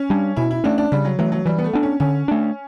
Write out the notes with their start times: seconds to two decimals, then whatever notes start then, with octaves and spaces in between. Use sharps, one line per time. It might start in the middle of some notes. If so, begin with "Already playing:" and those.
Already playing: C#4
0.10 G3 D4
0.36 B2 E4
0.51 E4
0.64 A3 C#4 D4
0.78 D4
0.92 C#3 G3
1.05 F#3
1.19 E3 F#3 A3
1.32 F#3
1.45 E3 G3
1.58 B3
1.64 A3
1.73 B3 D4
1.83 C#4
2.00 D3 C#4
2.28 A3 D4